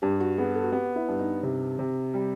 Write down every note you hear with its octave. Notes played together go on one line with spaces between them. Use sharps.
G2 G4
F#4
B3 G#4
A4
F#4
B3 G4
E4
G2
D#4
C3
C3
G3